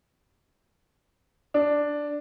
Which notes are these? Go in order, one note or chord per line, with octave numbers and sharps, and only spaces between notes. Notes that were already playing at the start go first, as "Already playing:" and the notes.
D4